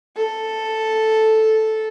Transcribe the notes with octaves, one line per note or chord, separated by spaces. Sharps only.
A4